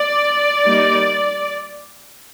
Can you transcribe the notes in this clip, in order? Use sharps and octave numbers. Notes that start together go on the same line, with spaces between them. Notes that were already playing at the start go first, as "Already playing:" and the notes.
Already playing: D5
G3 A#3 D#4